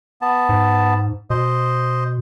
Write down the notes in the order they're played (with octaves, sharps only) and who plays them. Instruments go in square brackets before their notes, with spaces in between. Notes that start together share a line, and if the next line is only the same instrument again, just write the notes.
[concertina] B3 A5
[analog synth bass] G#2
[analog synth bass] B2 [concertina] C5 D#5